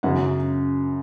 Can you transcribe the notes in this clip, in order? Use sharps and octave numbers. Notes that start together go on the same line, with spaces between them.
F#2 C#3 F#3 F#5